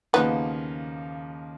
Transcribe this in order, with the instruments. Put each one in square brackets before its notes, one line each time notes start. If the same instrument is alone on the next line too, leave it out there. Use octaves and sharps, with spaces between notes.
[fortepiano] D#2 C#3 F3 A#3 D#4 [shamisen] B3